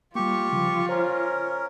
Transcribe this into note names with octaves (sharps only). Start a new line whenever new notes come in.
G3 A#3 F4 G4 C#6
C#3 F3
C#4 A#4 C5